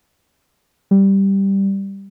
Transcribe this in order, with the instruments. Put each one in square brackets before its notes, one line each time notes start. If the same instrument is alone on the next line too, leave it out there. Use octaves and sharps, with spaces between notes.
[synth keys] G3